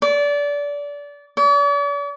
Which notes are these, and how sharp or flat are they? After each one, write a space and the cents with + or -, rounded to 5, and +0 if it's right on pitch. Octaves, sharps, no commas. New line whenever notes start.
D5 -25
D5 -45